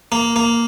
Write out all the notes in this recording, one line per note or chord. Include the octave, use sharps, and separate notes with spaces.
A#3
A#3